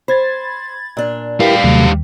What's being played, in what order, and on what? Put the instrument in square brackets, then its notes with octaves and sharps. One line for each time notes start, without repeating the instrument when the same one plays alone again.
[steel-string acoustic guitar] C5 [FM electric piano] B5 G#6 A6
[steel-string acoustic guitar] A#2 D4
[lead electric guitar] G3 F5 [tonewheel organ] E4 G4 A#4 [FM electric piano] B4 G5 B6
[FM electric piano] D#2 [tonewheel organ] C3 F#3 A3